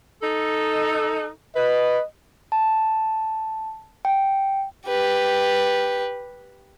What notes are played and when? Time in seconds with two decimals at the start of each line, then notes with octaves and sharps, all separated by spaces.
0.23 D#4 A4
1.56 B4 D#5
2.52 A5
4.05 G5
4.88 G4 B4